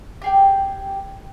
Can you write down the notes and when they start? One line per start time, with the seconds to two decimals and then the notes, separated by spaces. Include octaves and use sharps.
0.22 G4 G#4 G5